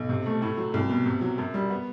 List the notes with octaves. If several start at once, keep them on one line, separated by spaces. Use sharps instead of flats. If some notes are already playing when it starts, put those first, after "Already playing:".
Already playing: B1
C3
A3
A2
F#3
C2
B2
C3
F#3
F#2
G3
B3